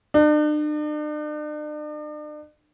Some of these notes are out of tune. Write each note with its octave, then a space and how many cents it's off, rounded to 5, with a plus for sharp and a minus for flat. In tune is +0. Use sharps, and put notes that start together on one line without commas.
D4 +45